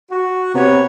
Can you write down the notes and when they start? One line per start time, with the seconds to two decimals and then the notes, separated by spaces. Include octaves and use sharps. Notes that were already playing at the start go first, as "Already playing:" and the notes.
0.11 F#4
0.55 C3 B3 B4 C#5